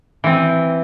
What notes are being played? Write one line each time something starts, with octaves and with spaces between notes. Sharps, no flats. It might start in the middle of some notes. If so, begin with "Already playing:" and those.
E3 C4